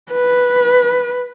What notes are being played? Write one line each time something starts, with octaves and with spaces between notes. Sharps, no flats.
B4